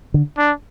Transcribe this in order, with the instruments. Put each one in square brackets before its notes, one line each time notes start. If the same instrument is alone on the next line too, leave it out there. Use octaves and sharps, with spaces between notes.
[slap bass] D3
[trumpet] D4